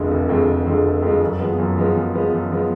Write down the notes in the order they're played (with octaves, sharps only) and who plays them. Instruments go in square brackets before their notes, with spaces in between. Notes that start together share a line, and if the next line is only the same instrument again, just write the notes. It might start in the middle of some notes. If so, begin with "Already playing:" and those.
Already playing: [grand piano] F1 F2 D3 G#3
F1
F2 D3 G#3
F1
F2 D3 G#3
F1
F2 D3 G#3
F#2
F3 G#3 B3
F#2
F3 G#3 B3
F#2
F3 G#3 B3
F#2
F3 G#3 B3